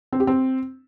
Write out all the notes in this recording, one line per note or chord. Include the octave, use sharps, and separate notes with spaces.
C4
G4
C4